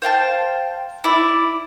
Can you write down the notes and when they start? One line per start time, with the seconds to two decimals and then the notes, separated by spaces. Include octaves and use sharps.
0.02 C5 F5 G5 A5
1.04 E4 D5